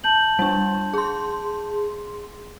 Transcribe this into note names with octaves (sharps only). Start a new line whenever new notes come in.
A5 G6 F#7
G3 D4
G#4 C6